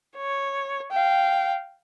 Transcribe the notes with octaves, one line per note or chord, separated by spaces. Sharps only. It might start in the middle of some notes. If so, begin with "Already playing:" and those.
C#5
F5 G5